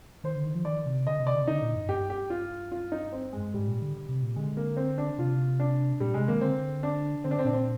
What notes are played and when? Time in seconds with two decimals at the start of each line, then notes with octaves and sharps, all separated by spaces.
0.24 D#3 C5
0.35 D3
0.44 D#3
0.55 F3
0.65 D#3 D5
0.86 C3
1.07 D3 D#5
1.20 C3
1.27 D5
1.34 D3
1.41 C3
1.47 D3 D#4
1.62 A#2
1.76 G2
1.88 G2 G4
2.10 G4
2.30 F4
2.72 F4
2.92 D#4
3.12 C4
3.33 G#3
3.54 G#2 G3
3.68 A#2
3.82 D3
4.09 C3
4.23 A#2
4.36 D3 G#3
4.57 A#3
4.77 C4
4.98 D4
5.18 C3 F4
5.60 D4
6.00 A#2 G3
6.14 C3 G#3
6.28 D#3 A#3
6.41 D3 C4
6.83 D4
7.24 D3 C4
7.31 D4
7.39 C4
7.45 A#2 D4
7.53 C4